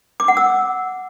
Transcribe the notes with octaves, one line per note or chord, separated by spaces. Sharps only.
D6
F#5
E6